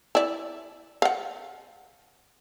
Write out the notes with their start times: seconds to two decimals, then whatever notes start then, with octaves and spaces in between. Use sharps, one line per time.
0.15 E4 D5
1.02 F5 F#5